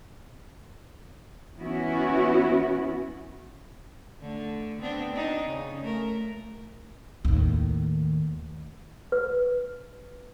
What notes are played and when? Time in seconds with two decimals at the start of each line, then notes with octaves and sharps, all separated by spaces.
1.59 E3 B3 C#4 E4 F#4
4.21 D3 A3
4.81 B3 C4 D4
5.14 D4 D#4
5.47 C#3
5.81 A3 A#4
7.25 D#2 A2
9.12 B4